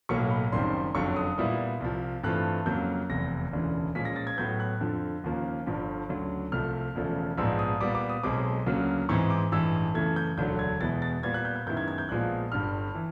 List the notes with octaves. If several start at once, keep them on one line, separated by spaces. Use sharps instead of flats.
B1 A2 F#3 A#3 C#6
B5
F#1 F#2 D#3 G3 C4 C6
F#1 F2 D3 F#3 C#6
D#6
A#2 G3 B3 E4
C2 C3 F3
G2 E3 A3 C4 F4 F#6
F2 C#3 F#3 A#3 G6
F1 E2 C3 A#6
E1 D2 C#3 E3
A#2 F3 G#3 C#4 B6
A#6
A6
G#6
A2 F#3 B3 G6
F#6
F2 D3 F3
D#2 C#3 F3 A#3
G1 G2 D3 F3
D2 C#3 F#3
C2 C3 F3 A3 F6
E1 E2 C#3 F3 A3
A#1 G#2 F3 G#3 B3 E6
D#6
A#2 G3 B3 D6
D6
D#6
B1 B2 G#3 C4 D6
D2 C#3 F#3 A#3
G#2 E3 G#3 C4 C#6
D6
A1 G2 E3 G#3 E6
F#2 C#3 E3 A3 G#6
G6
E1 D2 D3 F#3 G6
G#6
E2 B2 G#3 B3 E4 A6
A6
A#2 G3 B3 G#6
F#6
G6
G6
F#2 D#3 G#3 B3 E4 G6
G#6
G#6
G6
A#1 A#2 F3 G#3 B3 F#6
G1 G2 D3 G3 F6
E3